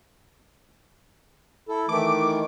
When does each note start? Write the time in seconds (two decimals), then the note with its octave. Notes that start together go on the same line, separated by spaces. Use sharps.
1.69 E4 A4
1.89 D#3 E3 A3 D6